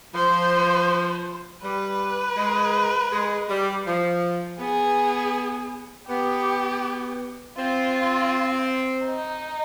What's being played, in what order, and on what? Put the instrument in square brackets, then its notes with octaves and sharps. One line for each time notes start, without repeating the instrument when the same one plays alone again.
[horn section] F3 [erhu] C5
[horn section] G3 [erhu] B4
[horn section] G#3
G#3
G3
F3
[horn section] B3 [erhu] G#4
[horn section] B3 [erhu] G4
[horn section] C4 [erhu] F4
[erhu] D#4